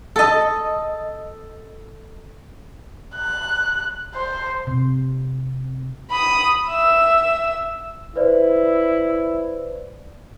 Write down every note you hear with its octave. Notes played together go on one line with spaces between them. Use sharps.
A4 D#5
F#6
C5
C3
B5 D#6
E5 E6
E4 B4 C5 D5